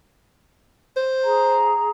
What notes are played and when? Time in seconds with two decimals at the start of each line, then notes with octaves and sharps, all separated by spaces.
0.96 C5
1.24 G#4 A#5